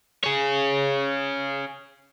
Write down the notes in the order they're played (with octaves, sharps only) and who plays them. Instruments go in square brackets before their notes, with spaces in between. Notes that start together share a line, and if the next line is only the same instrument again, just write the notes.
[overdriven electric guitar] G#4 C#5